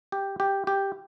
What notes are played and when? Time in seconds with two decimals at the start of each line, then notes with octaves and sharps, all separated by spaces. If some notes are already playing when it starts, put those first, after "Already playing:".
0.12 G4
0.40 G4
0.67 G4